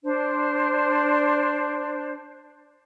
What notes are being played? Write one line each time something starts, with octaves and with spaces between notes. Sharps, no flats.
D4 C5